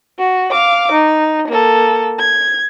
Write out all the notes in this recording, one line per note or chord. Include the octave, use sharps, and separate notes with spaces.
F#4
F5 D6
D#4
A#3 A4
G#6